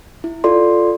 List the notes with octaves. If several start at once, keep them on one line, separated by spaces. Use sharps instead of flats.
E4
F4 A4 D5 C6